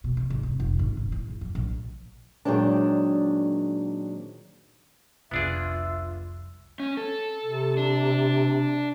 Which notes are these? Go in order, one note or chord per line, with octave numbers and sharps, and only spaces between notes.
B2
C3
G#1
C3
F1
G#1
D#1
E4
G#2
F2
A#1
A#2 D#3 F#3 G#3 C4 D4
F1 C2 F2 B3 D4 F4 G#4 E5
C#4
A4
C3
D4